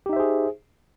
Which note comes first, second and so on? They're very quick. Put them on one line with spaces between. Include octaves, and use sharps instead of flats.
G4 D#4 E5 C5 G#4